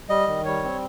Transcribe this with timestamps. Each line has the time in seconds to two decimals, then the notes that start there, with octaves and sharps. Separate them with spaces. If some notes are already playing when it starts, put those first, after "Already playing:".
0.09 G3 D#5
0.28 D#3
0.45 G3 C#5
0.64 C4